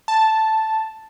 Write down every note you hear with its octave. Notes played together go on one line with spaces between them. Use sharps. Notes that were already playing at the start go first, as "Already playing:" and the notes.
A5